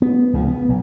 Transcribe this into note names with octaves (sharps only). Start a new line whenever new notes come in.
B3
C#2 C#3 E3 F3
B3
B1